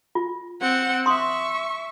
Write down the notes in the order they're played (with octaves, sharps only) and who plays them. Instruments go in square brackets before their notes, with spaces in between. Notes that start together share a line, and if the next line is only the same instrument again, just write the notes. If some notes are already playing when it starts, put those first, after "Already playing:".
[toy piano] F4
[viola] C4 F#5
[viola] E5 C#6 [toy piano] C6 D#6